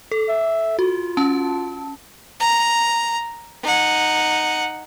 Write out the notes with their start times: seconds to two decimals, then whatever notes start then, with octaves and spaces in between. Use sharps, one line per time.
0.12 A4
0.29 E5
0.79 F4 F#4
1.17 C#4 A5
2.40 A#5
3.63 D#4 F#5